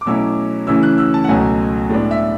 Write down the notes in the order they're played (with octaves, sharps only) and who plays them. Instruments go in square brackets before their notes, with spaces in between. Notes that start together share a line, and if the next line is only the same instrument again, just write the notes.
[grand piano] D6
B2 F#3 A3 C#4 E4 E6
C#3 E3 A3 C#4 E4 E6
F#6
E6
A5
F#5
C#2 B2 F#3 A3 G#5
A2 G#3 B3 D4
E5